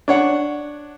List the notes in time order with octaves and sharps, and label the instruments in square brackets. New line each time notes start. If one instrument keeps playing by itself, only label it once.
[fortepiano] D4 C#5 F#5